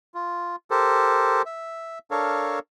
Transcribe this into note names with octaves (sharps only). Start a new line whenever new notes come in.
F4
G4 A4 A#4 C5
E5
D4 A4 A#4 C#5 F5